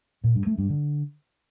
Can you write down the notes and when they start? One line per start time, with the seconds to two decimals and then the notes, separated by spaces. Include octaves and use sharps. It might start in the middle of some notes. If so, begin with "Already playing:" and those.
0.24 A#2
0.35 G2
0.46 A3
0.58 G2
0.69 D3